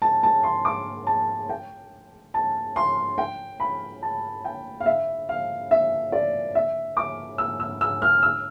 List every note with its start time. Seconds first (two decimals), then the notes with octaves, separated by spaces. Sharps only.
0.02 A5
0.23 A5
0.43 C6
0.65 D6
1.07 A5
1.49 G5
2.34 A5
2.76 C6
3.18 G5
3.60 B5
4.02 A5
4.45 G5
4.80 F5
4.86 E5
5.29 F5
5.71 E5
6.12 D5
6.55 E5
6.97 D6
7.38 E6
7.60 E6
7.81 E6
8.02 F6
8.23 E6